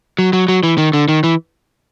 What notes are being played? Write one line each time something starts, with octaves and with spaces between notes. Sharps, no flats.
F#3
F#3
F#3
E3
D#3
D3
D#3
E3